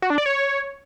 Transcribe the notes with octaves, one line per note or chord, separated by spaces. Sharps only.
F#4
D4
D5
C#5